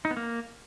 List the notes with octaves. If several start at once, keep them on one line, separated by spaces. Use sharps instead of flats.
D#4
B3
A#3